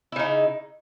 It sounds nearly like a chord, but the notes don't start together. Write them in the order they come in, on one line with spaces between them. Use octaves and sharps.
E4 C#3 D#4